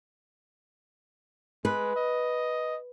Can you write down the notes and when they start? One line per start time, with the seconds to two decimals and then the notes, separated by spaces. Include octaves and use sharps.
1.65 G#3 B4
1.96 D#5